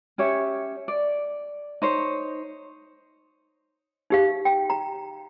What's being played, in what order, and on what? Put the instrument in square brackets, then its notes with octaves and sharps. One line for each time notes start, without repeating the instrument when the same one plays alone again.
[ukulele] C#4 G4 C#5 E5
D5
D#4 C5 C#5
[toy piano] D#4 G4 F5
G5
A#5